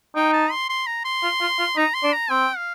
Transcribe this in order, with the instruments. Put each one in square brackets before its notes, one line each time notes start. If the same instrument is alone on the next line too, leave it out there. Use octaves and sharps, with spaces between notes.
[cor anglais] D#4 [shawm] G5
[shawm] A5
C6
C6
A#5
C6
[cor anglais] F4
F4
F4
[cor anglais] D#4 [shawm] A#5
[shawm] C6
[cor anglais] D4
[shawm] A#5
[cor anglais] C4 [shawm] G5
[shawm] F5